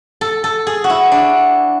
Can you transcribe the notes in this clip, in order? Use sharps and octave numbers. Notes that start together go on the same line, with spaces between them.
A4
A4
G#4
F#4
E4
D4